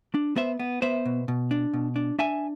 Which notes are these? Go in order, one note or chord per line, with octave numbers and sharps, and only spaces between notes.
D4
B3 C5 E5
B3
B3 C5 E5
B2
B2
D4
B2
D4
D4 E5 G#5